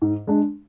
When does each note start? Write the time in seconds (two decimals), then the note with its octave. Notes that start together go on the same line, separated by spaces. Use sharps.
0.02 G#2
0.27 G#3 D4